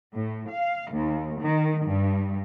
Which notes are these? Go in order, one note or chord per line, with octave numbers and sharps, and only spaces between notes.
A2
F5
D#2
D#3
G2